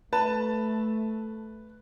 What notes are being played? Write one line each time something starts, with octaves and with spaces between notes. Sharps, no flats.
A3 B4 A5